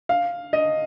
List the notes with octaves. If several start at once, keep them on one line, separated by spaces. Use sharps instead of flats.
F5
D#5